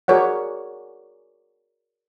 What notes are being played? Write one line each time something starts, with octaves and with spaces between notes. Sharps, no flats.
F#4 G#4 A#4 C#5 D5 F#5